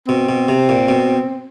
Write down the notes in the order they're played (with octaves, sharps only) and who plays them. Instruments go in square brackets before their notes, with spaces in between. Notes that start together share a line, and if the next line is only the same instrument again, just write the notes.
[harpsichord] B2 [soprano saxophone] C4
[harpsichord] B2
C3
A#2
B2